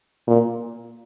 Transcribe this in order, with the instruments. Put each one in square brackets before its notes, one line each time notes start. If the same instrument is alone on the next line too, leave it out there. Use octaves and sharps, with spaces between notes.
[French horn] A#2